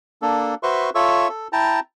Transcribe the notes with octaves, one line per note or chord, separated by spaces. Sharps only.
A#3 D4 A4
F#4 B4 C5 E5 C6 C#6
F4 A4 C#5 E5 C#6 E6
A4
E4 G5 A5 A#5